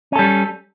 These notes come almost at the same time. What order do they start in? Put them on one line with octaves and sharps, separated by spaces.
C#4 A4 G3